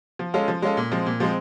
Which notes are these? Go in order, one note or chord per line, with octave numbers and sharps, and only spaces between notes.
F3
G#3 C#4 F4 A4
F3
G#3 C#4 F4 A4
A#2
F3 G#3 C4
A#2
F3 G#3 C4